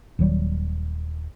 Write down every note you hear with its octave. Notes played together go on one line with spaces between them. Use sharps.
D#1 D#3 F#3 G3